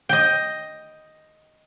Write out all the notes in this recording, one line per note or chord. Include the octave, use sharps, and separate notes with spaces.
D#5 G5